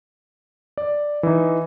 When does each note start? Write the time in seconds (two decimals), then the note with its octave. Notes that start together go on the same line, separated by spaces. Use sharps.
0.78 D5
1.23 E3 D#4